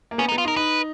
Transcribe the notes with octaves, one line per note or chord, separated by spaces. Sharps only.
A#3
B3 C#4
D#4
B3
F4
D#4
A#4
D#4 B4